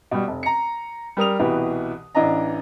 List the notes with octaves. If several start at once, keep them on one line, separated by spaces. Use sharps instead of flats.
B2 G3
F1
A#5 C#7
G3 A#4 D#6 F7
C2 B2 E3 G4 B4
A1 E3 D4 D#5 A#5